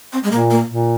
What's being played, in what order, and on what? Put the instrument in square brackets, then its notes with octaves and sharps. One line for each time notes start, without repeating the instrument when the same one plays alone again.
[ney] C4
G#3
[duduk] A#2 [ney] A#3
[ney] A#3
[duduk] A#2